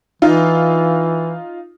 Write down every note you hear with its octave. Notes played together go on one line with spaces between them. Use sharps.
E3 D#4 F4